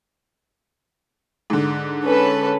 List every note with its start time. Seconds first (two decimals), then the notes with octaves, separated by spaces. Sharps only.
1.50 G#2 D3
2.06 C#4 A4 B4